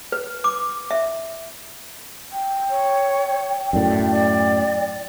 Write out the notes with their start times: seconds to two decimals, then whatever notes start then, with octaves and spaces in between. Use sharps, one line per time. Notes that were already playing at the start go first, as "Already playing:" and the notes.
0.12 B4
0.44 D6
0.91 E5
2.32 G5
2.70 C#5
3.73 F#2 A2 D5
4.10 D5